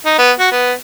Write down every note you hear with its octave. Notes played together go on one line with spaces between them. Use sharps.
D#4
B3
F#4
B3